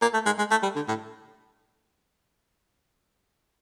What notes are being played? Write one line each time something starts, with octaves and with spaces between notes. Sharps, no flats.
A#3
A3
G#3
G#3
A3
G3
D3
A2